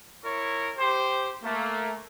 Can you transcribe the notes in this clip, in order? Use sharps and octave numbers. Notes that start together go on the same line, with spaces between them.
E4 A#4 C#5 C#6
G4 C5
A3 A#3